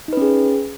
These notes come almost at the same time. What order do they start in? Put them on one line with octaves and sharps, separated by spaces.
D#4 B4 C#4 G#4